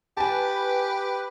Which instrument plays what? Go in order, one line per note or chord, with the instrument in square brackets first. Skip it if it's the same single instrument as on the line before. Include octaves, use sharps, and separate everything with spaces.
[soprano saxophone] G4 [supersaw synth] B4 [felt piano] G#5 A5